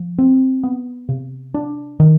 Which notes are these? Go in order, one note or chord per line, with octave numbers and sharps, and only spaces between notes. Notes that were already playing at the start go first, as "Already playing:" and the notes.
Already playing: F3
C4
B3
C3
D4
D#3